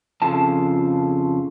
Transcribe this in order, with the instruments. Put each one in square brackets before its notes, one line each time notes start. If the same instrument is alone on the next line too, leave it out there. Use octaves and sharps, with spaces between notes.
[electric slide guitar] F2 C#3 F3 F4 A4 A5